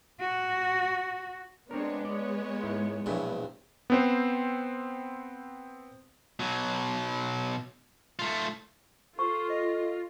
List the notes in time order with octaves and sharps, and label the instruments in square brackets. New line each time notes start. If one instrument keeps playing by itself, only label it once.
[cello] F#4
[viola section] G#3 B3 [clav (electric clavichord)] C4 A#4 [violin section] D4 C#5
[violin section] C#5 [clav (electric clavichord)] D5
[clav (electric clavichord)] G#2 E4
[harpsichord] A#1 G2 [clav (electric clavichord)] B2 F#3 E4
[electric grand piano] B3 C4 C5
[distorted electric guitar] B2 F#3
A3 F4
[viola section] F4 [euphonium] A4 [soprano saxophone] C5 [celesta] C#6
[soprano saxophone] D#5